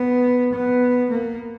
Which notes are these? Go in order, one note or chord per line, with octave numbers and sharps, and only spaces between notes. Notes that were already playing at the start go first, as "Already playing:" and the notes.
Already playing: B3
B3
A#3